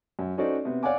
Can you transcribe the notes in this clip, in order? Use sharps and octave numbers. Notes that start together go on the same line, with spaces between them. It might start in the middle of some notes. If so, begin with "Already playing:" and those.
F#2
C#4 D#4 F#4 A4 C5 D5
C3 B3
C#5 D5 F5 F#5 G#5 D6